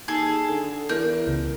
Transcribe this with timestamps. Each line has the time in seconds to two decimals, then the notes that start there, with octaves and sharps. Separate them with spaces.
0.08 D#2 G#4 A4
0.49 D3
0.89 E2 A#4 G6
1.27 C#2